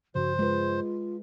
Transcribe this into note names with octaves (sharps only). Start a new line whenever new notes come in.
G2 C#3 F3 F#4 C5
G#3 F4 B4